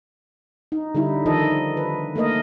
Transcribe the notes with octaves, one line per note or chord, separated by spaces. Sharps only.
D#4
D3 G3 D#4 E4
D#3 F3 D#4 A4 D#5
B4
A3 A#3 A#4 D#5